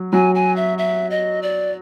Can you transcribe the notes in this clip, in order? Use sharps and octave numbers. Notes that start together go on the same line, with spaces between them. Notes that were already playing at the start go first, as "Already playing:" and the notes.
Already playing: F#3
F#3 G#5
G#5
E5
E5
D#5
D5